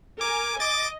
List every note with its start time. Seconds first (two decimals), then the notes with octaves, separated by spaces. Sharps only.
0.21 A#4 G#5 D6
0.60 D#5 D6 A6